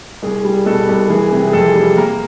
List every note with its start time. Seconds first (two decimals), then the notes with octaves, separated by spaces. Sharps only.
0.22 C2 G#4
0.45 G3
0.66 B2 A4
0.88 C2
1.10 E3 G#4
1.32 C3
1.47 G#4
1.53 F2 A4
1.75 G3
1.97 A#3 A#4